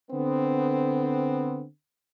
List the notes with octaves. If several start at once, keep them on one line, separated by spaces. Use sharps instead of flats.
D3 B3 C4